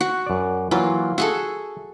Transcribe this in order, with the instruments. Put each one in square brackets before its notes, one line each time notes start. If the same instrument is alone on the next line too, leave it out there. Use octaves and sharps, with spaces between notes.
[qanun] F#4
[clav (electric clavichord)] F#2 D5
[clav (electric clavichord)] E3 F#3 A#3 [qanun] F4
[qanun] F#4 G#4 A4 [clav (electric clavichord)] E5